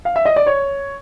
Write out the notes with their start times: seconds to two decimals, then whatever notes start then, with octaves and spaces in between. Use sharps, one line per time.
0.05 F5
0.16 E5
0.25 D#5
0.36 D5
0.46 C#5